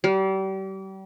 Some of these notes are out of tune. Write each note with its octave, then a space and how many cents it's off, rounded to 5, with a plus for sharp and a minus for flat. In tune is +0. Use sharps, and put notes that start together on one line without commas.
G3 -35